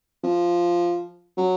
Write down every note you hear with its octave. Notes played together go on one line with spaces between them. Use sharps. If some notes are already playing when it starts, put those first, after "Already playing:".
F3
F#3